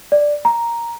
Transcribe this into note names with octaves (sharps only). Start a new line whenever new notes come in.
D5
A#5